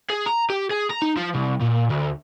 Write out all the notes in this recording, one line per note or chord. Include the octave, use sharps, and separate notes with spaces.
G#4
A#5
G4
G#4
A#5
D#4
F3
C2
A#2
D2